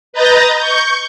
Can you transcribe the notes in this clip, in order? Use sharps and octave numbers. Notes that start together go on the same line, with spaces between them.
B4 D#5 A#5 G6 A6 A#6
C#6 G6